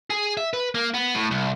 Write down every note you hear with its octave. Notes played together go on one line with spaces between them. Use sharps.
G#4
E5
B4
A#3
B3
A2
C2